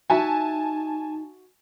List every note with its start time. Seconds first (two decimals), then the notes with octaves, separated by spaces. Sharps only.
0.10 D#4 F#4 E5 G#5 A5